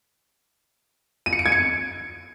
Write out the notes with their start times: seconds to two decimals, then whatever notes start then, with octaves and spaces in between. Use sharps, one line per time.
1.26 D#7
1.33 C#7
1.39 D7
1.46 G#6
1.52 C#7